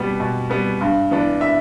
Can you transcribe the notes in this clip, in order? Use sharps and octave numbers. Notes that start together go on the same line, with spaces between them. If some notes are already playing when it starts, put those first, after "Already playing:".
Already playing: B2 G3 B3
B2
G3 B3
G2
E3 B3 D4
E5